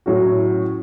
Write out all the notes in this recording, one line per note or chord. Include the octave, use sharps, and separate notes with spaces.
A2 F#3 C#4 F#4